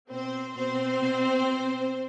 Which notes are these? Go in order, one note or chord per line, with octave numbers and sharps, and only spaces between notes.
B2 C4 C5
B2 C4 C5
B2
B2